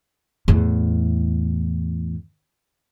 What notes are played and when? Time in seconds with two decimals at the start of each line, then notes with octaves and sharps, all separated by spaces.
0.48 E2 A2